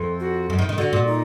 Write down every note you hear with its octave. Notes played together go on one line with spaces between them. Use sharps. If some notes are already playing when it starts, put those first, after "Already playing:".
Already playing: F2
F#4
F#2
D#3
D#3
D3 F#4
A#2
D#4